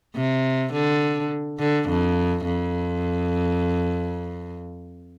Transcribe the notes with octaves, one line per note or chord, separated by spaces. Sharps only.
C3
D3
D3
F2
F2